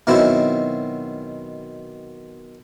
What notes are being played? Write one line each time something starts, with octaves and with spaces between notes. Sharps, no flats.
B2 D#3 F#3 C4 E4